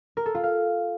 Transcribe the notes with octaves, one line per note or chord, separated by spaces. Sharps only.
A#4
A4
F4
F5